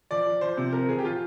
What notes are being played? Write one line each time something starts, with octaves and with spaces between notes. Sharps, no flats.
F3 D5
F3
F3 C5
C3
F3 A#4
F3 G#4
G4
F3 F4